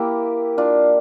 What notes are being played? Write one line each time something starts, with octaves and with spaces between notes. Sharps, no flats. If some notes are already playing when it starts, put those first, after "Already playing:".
Already playing: A#3 E4 G4
D4 F4